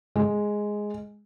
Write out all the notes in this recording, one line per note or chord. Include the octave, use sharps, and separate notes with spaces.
G#3